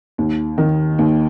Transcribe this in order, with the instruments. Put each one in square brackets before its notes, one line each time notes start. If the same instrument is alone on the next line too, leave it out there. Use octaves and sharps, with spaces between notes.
[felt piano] D#2
D#3
D#2